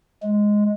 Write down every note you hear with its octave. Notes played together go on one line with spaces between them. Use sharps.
G#3